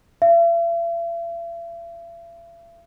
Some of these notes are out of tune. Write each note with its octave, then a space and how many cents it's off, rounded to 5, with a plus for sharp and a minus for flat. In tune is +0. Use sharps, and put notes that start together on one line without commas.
E5 +45